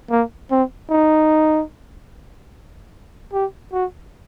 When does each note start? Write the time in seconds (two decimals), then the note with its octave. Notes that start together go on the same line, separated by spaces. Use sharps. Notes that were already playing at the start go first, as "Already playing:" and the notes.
0.10 A#3
0.51 C4
0.91 D#4
3.33 G4
3.73 F#4